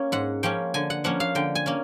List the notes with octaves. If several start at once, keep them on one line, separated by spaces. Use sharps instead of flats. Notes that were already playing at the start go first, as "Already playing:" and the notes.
Already playing: A#3 C#4
G#2 F#5
F3 A#3 C#4 G5
D3 G#5
F#5
F3 A#3 C#4 F#5
F5
D3 G5
G#5
A#3 C#4